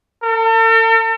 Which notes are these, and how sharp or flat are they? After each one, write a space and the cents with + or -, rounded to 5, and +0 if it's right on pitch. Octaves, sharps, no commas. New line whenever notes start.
A4 +45